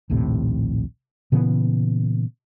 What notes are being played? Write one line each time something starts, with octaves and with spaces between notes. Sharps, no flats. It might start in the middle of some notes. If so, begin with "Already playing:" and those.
A#1 D#2 A2 C3
A#2 C#3 E3 B3